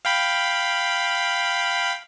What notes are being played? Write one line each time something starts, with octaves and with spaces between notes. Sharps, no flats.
F5 G5 B5